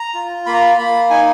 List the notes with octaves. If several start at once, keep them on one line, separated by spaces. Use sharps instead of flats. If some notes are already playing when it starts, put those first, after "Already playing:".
Already playing: A#5
F4
A#3 B5
A#5
B5
A#3 B5
D#4 G#5